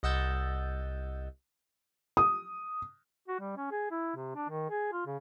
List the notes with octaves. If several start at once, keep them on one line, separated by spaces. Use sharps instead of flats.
C2 D#5 F#5 E6 G6 A6
D#6
F#4
G3
C#4
G#4
E4
C3
D4
D#3
G#4
F4
C#3